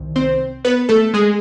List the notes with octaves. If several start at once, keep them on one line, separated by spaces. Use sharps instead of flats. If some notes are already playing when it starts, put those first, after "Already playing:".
Already playing: C2 C3 D#3
C4 C5
B3 B4
A3 A4
G#3 G#4